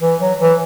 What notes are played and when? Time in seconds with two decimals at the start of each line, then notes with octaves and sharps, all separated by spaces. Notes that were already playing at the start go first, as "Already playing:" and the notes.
0.01 E3
0.20 F#3
0.40 E3